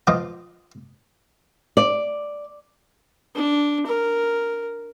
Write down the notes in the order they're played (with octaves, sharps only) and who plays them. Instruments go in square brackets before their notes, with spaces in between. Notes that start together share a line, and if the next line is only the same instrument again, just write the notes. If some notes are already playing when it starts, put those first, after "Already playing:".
[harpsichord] F3 F4 D#5 D6
[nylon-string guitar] D5
[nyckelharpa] D4
A#4